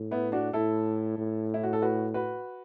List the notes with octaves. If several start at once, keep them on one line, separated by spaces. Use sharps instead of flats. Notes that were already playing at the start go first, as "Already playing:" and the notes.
Already playing: A2
B3 E4
D4 F#4
A2 E4 A4
A2
E4
F#4
A4
F#4 B4
F#4 B4